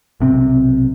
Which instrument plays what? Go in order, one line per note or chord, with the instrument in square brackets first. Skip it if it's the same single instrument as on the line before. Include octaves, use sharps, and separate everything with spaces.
[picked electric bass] B1 C3 C4